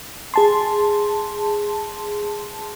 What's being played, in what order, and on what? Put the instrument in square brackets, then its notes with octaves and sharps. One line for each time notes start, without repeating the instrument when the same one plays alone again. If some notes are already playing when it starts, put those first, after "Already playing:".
[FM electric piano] G#4 A5 C6